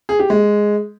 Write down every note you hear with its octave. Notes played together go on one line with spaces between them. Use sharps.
G#4
G4
G#3